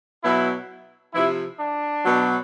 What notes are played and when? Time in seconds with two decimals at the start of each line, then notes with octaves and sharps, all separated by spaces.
0.23 B2 F#3 E4
1.13 C3 F3 E4
1.59 D4
2.04 B2 F#3